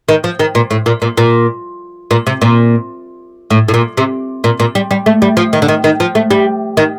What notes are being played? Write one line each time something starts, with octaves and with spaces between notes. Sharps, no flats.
D#3
F3
D#3
A#2
A2
A#2
A#2
A#2
A#2
C3
A#2
A2
A2
A#2
C3
A#2
A#2
G3
G3
A3
G3
F3
D#3
D3
D#3
D#3
F3
A3
G3
D#3